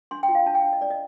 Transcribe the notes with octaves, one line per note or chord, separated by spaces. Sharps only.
D4 C6
G5
F4
F5
D4 A5
G5
D4
D#5
D4 D5
D#5